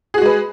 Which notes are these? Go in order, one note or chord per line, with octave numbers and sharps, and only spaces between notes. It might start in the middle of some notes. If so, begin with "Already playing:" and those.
G#3 F#4 G#4 B4